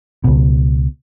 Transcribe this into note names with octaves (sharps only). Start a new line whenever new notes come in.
C#2 B2